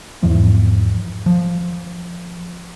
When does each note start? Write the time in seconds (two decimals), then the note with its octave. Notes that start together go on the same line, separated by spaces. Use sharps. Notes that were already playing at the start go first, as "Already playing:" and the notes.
0.23 E2 G#2 E3 F3
1.26 F3